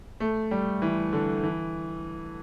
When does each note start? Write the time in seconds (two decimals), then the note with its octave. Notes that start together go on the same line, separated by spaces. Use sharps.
0.20 A3
0.51 G3
0.82 E3
1.13 D3
1.44 E3